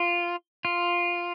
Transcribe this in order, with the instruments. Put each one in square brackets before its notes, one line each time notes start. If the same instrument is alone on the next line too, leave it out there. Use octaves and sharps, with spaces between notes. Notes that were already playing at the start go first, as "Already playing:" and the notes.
Already playing: [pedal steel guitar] F4
F4